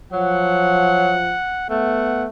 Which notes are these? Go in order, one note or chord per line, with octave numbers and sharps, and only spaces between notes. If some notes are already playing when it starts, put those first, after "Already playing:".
F3 F#3 F#5
A3 B3 F#5